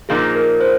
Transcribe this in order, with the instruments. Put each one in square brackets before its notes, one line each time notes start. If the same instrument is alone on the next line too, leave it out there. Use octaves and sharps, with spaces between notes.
[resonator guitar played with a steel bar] A#2 F3 A#3 D#4 [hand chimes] G#4
[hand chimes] A#4
C5